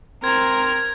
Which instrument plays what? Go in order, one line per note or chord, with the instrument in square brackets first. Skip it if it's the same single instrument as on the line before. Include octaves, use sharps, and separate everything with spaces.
[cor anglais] C4 [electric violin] A#4 A#5 [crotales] G#6